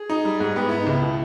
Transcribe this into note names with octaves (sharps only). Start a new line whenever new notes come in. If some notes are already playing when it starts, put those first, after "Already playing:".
Already playing: G#4
D#4
G3
G#2
B3 G4
B3 E4
D#4
C#2 E4
B2